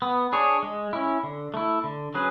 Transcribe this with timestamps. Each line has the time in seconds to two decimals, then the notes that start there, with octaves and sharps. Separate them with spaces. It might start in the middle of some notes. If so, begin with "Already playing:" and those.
0.02 B3
0.33 D4 G#4 C#5
0.63 G#3
0.93 C#4 E4
1.23 D3
1.54 A3 E4
1.84 D3
2.14 F#3 C#4 G#4 B4